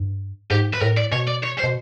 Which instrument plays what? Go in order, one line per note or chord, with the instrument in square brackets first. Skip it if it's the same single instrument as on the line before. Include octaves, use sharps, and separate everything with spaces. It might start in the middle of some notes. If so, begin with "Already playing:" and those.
Already playing: [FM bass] G2
[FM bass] G#2 [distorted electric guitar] G4
[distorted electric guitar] B4
[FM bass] A2 [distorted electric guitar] A#4
[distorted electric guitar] D5
[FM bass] B2 [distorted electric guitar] C#5
[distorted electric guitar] D5
C#5
C5
[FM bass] B2